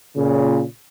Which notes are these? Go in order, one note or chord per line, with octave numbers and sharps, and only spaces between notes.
A#2 C#3